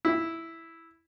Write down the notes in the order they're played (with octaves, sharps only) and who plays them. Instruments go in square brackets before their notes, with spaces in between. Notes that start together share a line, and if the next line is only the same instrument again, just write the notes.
[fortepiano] E4